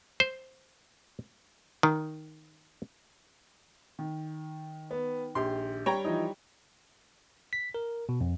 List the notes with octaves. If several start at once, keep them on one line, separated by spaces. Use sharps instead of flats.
C5
D#3
D#3
B3
A#1 G4 C6
G3 C#5 G5 A#5
E3 F3 D#4
B6
A#4
B2
F2